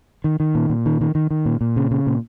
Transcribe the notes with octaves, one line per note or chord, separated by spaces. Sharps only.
D#3
D#3
A#2
A#2
D#3
D#3
D#3
D#3
A#2
A#2
C#3
C#3
A#2